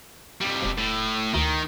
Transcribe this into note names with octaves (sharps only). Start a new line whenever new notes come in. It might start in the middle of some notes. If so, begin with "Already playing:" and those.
F2 G3
E1
A2
D2 D#3